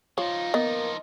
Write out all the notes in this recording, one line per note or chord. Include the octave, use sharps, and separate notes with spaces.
F3 D#4 F4 C#5
A#3 B3 D#5